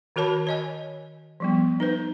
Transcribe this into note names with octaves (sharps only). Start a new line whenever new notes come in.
D#3 F#4 A#4 C#5 A5 B5
C#5 D#5 G#5
F3 G3 B3
D#4 B4 C5